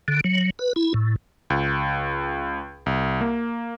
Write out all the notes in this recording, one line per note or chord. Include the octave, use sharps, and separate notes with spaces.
D3
F#3
B4
E4
A2
C#2
C2
A#3